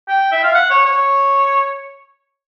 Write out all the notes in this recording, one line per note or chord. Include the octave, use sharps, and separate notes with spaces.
G5
E5
F5
F#5
C#5
C#5